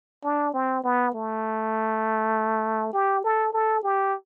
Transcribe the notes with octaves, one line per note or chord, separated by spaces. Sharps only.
D4
C4
B3
A3
G4
A4
A4
G4